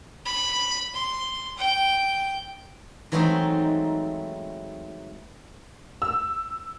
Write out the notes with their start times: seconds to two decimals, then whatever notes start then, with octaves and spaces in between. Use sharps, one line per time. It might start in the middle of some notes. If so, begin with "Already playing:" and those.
0.25 B5
0.94 C6
1.57 G5
3.12 E3 F#3 G#3 A3 C4 D#4
6.02 E6